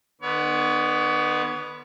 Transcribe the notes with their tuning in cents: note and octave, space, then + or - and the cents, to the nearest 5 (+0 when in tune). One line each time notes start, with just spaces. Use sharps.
D#3 -45 B3 +0 C#5 +35